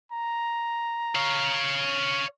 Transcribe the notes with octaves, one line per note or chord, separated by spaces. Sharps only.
A#5
C#5 F5